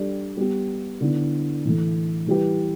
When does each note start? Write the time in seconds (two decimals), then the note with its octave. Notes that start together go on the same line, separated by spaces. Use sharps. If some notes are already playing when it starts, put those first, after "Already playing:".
Already playing: G3 D4 A4 D5
0.37 G3 B3 G4
1.01 D3 B3 E4
1.64 A2 E3 A3
2.27 E3 G3 E4 G4 B4